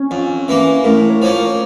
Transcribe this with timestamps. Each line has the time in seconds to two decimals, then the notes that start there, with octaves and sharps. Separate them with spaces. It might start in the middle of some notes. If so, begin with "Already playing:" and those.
Already playing: C#4
0.11 F2
0.48 E3 A#3
0.84 A2 A#4
1.10 C#5
1.22 F3 A#3 C#4
1.33 A#4